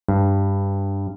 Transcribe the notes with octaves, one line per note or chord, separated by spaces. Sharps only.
G2